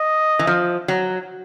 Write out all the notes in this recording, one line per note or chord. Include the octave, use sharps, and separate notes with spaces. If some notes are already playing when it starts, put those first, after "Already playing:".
Already playing: D#5
E3
F3
F#3